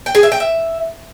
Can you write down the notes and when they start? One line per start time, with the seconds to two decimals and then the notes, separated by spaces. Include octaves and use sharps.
0.06 G5
0.15 G#4
0.23 E5
0.32 G5
0.40 E5